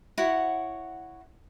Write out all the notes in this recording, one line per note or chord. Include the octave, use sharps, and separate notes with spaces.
E4 F#4 C#5 F#5